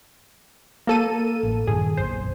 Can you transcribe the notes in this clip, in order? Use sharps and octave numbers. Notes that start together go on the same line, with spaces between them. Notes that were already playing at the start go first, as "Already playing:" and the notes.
A#3 A4 D#7
A1
G2 A#2 D#3 G#4
F#1 B1 C5